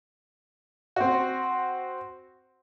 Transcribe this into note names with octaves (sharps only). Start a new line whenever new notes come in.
C4 F#4